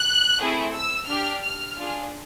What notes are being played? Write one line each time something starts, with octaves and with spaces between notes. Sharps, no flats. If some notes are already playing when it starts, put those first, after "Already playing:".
Already playing: F#6
A3 C4 E4 G#4
E6
D4 G4 F6
F6
D4 F4 G#4